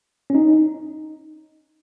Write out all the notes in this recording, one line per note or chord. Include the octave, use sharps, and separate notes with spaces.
C#4
D#4